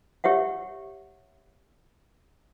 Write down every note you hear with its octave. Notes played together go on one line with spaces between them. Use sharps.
G4 C#5 E5 F#5